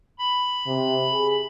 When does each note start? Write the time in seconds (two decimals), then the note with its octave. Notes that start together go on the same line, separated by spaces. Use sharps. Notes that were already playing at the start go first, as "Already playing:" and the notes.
0.18 B5
0.67 C3
1.12 G#4